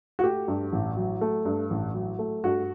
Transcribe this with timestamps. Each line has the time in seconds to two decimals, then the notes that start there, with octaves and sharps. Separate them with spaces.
0.19 F#4
0.24 A3 G4
0.48 G2
0.72 A1
0.97 F#3
1.21 A3
1.45 G2
1.70 A1
1.94 F#3
2.19 A3
2.44 G2 F#4